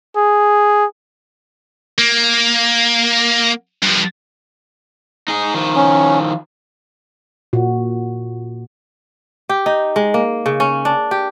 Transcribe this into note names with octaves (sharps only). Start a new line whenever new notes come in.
G#4
A#3
G2 F3
D#4 G#4
D#3 F3
C#4
A#2 F#4
G4
D#4
G#3
A#3
C#3
C#4
D4
G4